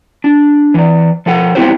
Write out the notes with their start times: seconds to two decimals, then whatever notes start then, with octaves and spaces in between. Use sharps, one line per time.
0.24 D4
0.74 E3 D5
1.26 F3 A4 F#5
1.55 G#3 B3 C4 E4 G4 C5